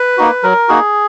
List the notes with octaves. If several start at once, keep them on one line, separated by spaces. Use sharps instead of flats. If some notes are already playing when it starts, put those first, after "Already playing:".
Already playing: B4
A#3 D#4 F#4
F#3 A#4
A#3 D#4 F#4 G#4